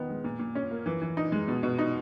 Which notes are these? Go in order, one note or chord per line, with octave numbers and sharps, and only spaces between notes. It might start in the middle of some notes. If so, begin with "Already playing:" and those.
Already playing: D#3 B3
G#3
A#2
A#2
C#4
A#3
E3
E3
D#4
G#3
B2
B2
D#4